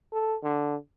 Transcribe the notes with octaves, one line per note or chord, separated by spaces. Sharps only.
A4
D3